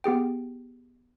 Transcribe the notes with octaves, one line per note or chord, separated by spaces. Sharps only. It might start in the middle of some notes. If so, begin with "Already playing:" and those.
B3 G4 G#4 G5